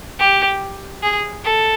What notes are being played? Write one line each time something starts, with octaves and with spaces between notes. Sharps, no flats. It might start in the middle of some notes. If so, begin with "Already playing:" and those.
G4
G#4
A4